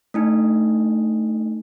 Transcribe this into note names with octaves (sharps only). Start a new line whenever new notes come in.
A3 D4 D#4